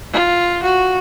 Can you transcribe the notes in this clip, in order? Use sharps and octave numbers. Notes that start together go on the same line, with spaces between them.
F4
F#4